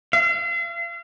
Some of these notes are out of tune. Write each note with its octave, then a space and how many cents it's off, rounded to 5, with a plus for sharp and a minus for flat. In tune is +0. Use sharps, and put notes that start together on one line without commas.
F5 -40